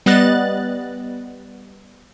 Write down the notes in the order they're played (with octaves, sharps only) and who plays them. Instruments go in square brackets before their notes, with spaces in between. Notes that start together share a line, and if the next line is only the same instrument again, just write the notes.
[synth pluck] G3 B3 D#5 F#6 A6